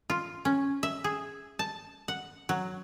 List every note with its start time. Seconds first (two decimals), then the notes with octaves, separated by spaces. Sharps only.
0.10 F4
0.45 C#4
0.83 E5
1.04 G#4
1.59 A5
2.08 F#5
2.49 F#3